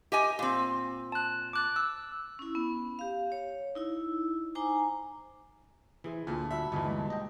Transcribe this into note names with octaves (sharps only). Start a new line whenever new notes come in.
G4 D#5 G#5
A#2 C4
A5 F#6
D6 F#6 A6
E6
C#4 E4
B3
G4 F5
C#5
D#4 E4 E6
D#4 C5 G#5 A#5 D6
E3 E4 G#4 C5
D2 A#2 F4 A5
G3 F#4 E5 B5
G1 D#2 A#2 E3 D#4 G4
G#3
D#5 G5